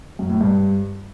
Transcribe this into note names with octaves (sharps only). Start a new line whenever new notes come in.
F#2
A2
G2